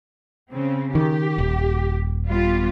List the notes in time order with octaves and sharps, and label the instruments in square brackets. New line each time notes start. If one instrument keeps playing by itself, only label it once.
[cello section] C#3 C4
[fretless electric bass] D#3 [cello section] G4
[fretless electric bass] D#1
[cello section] G3 B3 F4